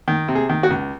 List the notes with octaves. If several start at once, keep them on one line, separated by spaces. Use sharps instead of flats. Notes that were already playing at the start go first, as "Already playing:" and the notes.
D#3
C3
G#4
D#3
F#4
C#2